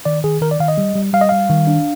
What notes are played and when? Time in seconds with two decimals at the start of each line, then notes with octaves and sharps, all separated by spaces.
0.05 D#3 D5
0.24 D#3 G#4
0.42 D#3 A#4
0.51 D5
0.60 D#3 F5
0.68 D#5
0.78 G3
0.95 G3
1.13 G3 F5
1.21 D#5
1.29 G3 F5
1.50 D#3
1.67 D4